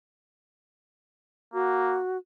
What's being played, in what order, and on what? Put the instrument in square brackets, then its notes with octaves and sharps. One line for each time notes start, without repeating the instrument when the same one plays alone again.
[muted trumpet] A#3 [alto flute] F#4